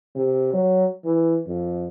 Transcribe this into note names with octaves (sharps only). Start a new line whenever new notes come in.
C3
F#3
E3
F2